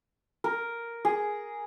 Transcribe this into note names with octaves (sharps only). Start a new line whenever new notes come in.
A#4
G#4